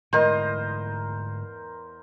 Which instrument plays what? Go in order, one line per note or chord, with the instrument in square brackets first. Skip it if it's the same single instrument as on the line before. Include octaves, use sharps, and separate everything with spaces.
[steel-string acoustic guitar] E2 D#5 [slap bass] G#2 D3 A3 [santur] A#4 C5